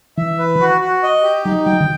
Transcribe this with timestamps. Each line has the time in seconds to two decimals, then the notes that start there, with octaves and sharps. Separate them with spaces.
0.18 E3 E5
0.39 B4
0.61 F#4
0.81 F#4
1.03 D#5
1.23 G4
1.45 F#3 D#4
1.65 F#3 G5
1.81 D#3